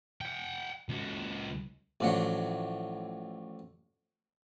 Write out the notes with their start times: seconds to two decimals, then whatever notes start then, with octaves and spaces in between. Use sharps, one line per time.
0.21 F#5 G5
0.89 C#2 F#4
2.00 A1 A2 F3 F#3 D4 F#5